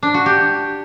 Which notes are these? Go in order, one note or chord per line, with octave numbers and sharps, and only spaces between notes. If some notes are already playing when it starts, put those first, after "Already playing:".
D4
F#4
G4